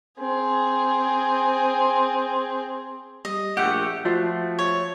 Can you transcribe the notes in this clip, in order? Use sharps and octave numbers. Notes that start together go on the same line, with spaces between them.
C4 G#4
G3 D#5
A#1 A3 G4 F#5
F3 A3 F4 F#4 C5
C#5